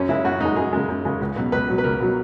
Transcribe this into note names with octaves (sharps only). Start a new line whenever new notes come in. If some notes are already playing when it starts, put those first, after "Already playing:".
Already playing: F#2 C#4
C#3 G#3 E4
F#2 F#4
C#3 G#3 D#4
F#2 G#4
C#3 G#3
F#2
C#3 G#3
C#2
B2 F#3
C#2 B4
B2 F#3
B4
C#2 A#4
B2 F#3